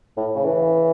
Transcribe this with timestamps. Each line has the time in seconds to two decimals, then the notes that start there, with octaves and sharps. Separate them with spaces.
0.17 A2
0.36 C#3
0.45 E3